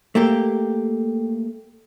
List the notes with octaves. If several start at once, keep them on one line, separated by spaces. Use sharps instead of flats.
A3 A#3 G4